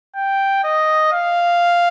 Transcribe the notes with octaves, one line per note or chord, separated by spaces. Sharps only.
G5
D#5
F5